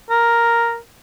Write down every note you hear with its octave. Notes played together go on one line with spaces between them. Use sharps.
A#4